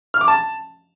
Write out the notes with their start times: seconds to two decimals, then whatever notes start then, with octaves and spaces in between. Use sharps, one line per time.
0.14 F6
0.21 D6
0.28 A5